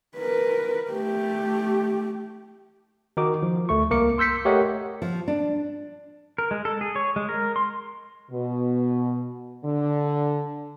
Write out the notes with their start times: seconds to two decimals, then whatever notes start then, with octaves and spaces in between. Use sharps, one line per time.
0.17 A#4 B4
0.91 A3 G4
3.17 D#3 D#4 F#4 D6
3.43 F3
3.69 D2 A3 C#6
3.91 C2 A#3 A#4 D6 C#7
4.18 C6 E6 G6 B6 C#7
4.45 A3 G4 A#4 C#5 D#5 F#5
5.02 F3
5.28 D4
6.38 A#4
6.51 G#3
6.65 A4
6.81 G#4
6.96 C#5
7.16 G#3
7.29 A#4
7.56 C6
8.31 B2
9.65 D3